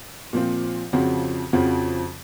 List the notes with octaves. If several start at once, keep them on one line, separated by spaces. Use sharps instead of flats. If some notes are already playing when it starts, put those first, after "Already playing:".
A#2 F3 C4 F4
F2 C#3 F3 C4 F#4
F2 C#3 F3 C4 F#4